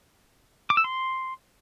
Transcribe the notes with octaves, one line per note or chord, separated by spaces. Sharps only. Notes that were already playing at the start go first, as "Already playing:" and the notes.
D6
E6
C6